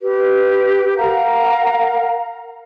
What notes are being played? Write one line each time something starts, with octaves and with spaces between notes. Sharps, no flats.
G4 B4
A#4 F5 F#5 A#5